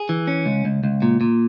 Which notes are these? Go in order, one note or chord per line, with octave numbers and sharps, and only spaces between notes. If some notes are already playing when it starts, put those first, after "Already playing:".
Already playing: G#4
E3
C#4
C#2
C#2
C#2
A#2
A#2